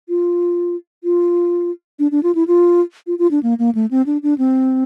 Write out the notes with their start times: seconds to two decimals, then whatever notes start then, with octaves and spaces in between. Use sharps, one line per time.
0.09 F4
1.04 F4
1.99 D4
2.12 D4
2.23 F4
2.35 E4
2.48 F4
3.07 F4
3.19 F4
3.31 D4
3.43 A#3
3.59 A#3
3.75 A3
3.91 C4
4.06 D4
4.23 D4
4.38 C4